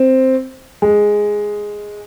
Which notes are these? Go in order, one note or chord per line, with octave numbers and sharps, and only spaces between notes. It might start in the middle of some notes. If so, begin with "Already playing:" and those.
Already playing: C4
G#3